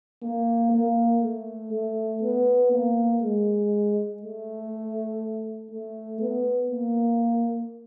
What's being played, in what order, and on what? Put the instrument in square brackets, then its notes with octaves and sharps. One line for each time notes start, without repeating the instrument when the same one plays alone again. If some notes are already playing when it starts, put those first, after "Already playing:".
[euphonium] A#3
A#3
A3
A3
B3
A#3
G#3
A3
A3
B3
A#3